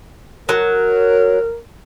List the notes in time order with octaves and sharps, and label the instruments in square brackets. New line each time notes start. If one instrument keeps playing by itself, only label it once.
[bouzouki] F#3 [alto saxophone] A#4